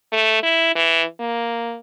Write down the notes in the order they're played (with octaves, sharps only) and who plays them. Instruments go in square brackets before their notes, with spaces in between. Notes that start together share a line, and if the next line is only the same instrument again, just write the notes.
[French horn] A3
E4
E3
A#3